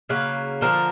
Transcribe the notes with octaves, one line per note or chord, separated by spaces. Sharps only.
C#3 F#3 A#3 B4
D3 F3 A#3 A#4